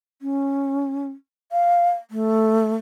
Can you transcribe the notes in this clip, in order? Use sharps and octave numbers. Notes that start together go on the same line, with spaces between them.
C#4
F5
A3